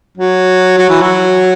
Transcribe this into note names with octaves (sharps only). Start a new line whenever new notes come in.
F#3
F#3
E3
F#3